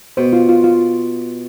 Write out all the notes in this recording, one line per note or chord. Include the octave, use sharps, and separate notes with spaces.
B2 C5
F4
F4
F4